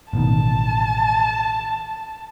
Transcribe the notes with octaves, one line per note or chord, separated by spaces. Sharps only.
A1 B2 D#3 A5